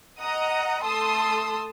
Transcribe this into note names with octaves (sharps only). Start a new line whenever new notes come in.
D#5 F#5 A#5 D#6
A3 A5 C6 D#6 E6